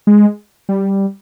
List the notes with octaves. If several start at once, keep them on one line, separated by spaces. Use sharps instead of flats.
G#3
G3